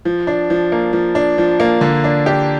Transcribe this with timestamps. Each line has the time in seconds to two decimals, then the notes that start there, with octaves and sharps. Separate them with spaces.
0.05 F3
0.27 D4
0.50 F3
0.72 A#3
0.93 F3
1.15 D4
1.38 F3
1.60 A#3
1.81 D3
2.04 D4
2.26 G4